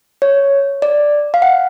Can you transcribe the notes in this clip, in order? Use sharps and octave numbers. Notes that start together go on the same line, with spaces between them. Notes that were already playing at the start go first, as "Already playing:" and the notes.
C#5
D5
F5
F#5